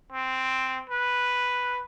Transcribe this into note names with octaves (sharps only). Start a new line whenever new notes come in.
C4
B4